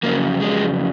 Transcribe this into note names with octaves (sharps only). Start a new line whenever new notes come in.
F2 C#3 F#3 A#3
G#3